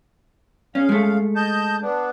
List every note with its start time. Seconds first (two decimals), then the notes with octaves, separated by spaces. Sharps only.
0.75 C#3 C#4 F5
0.89 G#3 A3
1.36 D#5 A5 G6
1.82 B3 D4